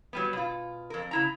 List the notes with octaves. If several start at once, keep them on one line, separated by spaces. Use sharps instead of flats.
F#3 G3 B3
B2 F4
F2 A#4
C#3 E4 A#5